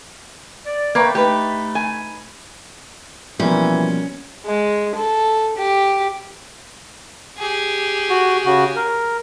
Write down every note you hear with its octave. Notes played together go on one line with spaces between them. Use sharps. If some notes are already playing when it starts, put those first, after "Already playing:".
D5
A3 A#3 B4 C#5 G5
A3 D#4 G4 B4
G#5
B2 E3 F3 G3 A#3 C#4
G#3
A4
G4
G4 G#4
F#4
C#3 F#4
A#4